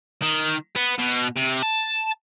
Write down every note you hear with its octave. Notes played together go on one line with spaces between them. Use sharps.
D#3
B3
B2
C3
A5